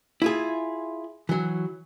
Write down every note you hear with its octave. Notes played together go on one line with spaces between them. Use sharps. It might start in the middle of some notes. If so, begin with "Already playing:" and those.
E4 F4 G#4
E3 F#3